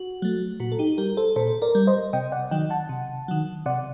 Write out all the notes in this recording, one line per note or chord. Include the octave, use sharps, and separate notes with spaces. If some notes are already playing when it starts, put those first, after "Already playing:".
Already playing: F#4
F#3 A3
A#2 F#4
A4
D#4 G4
G3 G4 A#4
A4 C5
A#2 A4 C5
A#4 D5
G3
C5 D#5
C3 D#5 G5
D5 F#5
D#3 F#3 D#5 G5
F#5 A5
C3
D#3 F#3
C3 D5 F#5